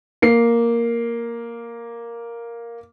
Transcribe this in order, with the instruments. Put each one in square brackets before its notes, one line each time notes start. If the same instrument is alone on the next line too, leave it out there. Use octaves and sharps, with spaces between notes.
[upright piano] A#3 C7